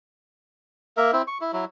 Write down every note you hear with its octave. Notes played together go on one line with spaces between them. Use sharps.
A#3 A#4 E5
C4 E4
C#6
E4
F#3 E4